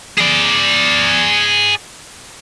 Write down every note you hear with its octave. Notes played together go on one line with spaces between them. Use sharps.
G#4 D5